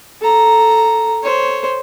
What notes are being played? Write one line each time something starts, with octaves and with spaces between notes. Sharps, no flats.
A4 A#5
C5 C#5